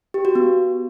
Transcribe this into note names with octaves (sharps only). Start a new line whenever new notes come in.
G4
F#4
B3